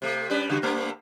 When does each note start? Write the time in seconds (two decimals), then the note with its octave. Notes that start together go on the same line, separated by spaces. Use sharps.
0.02 C3 A3
0.30 G3 C#4 B4
0.50 C#3 G3 F#4
0.62 G2 A3 A#3